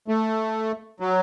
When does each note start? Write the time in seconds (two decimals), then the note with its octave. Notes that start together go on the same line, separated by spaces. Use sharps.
0.08 A3
1.00 F#3